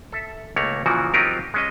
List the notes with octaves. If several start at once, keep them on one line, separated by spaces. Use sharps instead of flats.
A4 E5
C#2 A3 A#3 C#5
A#2 C#3 E3 F3 F#4
F#3 C4 D#4 F4 G4 A#4
G#3 C#4 D#5